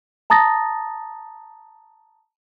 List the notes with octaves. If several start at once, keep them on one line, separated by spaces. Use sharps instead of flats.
A5 A#5 D#6 A6 A#6